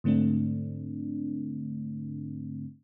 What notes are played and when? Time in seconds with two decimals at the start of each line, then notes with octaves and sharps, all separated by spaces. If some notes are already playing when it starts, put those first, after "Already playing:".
0.04 G#2 D3 A3 C4 D4